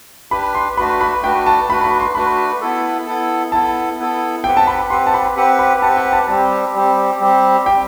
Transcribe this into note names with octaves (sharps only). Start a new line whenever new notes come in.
D4 G4 B4 B5
C6
A3 D4 F#4 B4 B5
B5
A3 D4 F#4 B4 G5
A5
A3 D4 F#4 B4 B5
B5
C6
A3 D4 F#4 B4 B5
B3 E4 A4
B3 E4 A4
B3 E4 A4 A5
B3 E4 A4
C4 G4 B4 F#5 G5
A5
B5
C4 G4 B4 F#5 C6
A5
B5
C4 G4 B4 F#5
B5
C4 G4 B4 F#5 A5
G5
A5
G3 C4 G4 A5
G3 C4 G4
G3 C4 G4
G3 C4 G4 G5